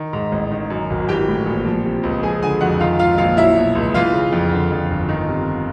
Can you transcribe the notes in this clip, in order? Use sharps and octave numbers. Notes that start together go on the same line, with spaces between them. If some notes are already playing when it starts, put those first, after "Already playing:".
Already playing: D#3
G#2
A1
D#3
F#2
G#1
E3 G4 G5
A2
A#1
F3
C3
C#2
F3 G#4 G#5
D3 G#4 G#5
F2 F#4 F#5
D#3 F4 F5
G#2 F4 F5
A#1 F4 F5
F#3 E4 E5
B2
C#2
E3 F4 F5
C#3
F2
D3
F2
G1
D#3
C3